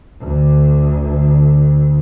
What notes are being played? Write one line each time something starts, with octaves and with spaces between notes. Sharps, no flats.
D2 D3